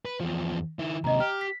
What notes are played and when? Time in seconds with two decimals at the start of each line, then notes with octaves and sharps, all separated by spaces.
0.05 B4
0.20 E2 F3
0.79 D#3 E4
1.04 D#2 C3 D#5 A#5
1.20 G4 F6
1.41 B6